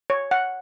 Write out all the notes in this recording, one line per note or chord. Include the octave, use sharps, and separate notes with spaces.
C#5
F#5